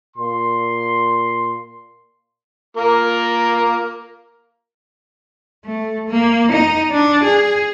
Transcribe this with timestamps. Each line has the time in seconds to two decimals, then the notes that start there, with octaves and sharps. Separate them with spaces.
0.17 A#2 C6
2.77 A#3 F4 A#4
5.65 A3
6.09 A#3
6.52 D#4
6.91 D4
7.24 G#4